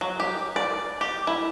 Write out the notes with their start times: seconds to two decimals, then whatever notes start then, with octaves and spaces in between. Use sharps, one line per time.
0.01 F#3
0.20 G4
0.56 D5
1.01 G4
1.27 E4